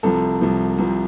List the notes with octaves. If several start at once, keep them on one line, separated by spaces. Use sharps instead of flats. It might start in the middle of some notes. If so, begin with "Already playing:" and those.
C2 C3 F3 A4
C2 C3 F3
C2 C3 F3